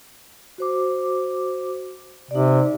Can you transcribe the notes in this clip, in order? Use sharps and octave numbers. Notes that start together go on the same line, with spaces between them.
F#4 C5 D6
C3 D#4 D5